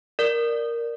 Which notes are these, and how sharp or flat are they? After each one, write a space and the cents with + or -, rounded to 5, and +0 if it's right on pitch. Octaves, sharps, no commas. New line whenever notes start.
A#4 +0 D5 +0